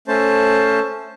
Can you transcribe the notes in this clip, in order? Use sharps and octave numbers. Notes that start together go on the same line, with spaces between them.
A3 C#4 C5 A5